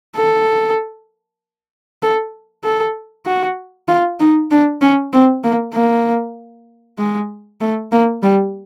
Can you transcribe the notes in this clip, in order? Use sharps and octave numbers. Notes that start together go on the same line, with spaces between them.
A4
A4
A4
F#4
F4
D#4
D4
C#4
C4
A#3
A#3
G#3
A3
A#3
G3